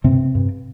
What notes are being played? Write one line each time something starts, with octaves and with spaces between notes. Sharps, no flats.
G2 C3 C4
G2